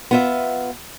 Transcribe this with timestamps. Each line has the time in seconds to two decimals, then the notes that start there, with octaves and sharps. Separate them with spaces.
0.11 B3 F4 E5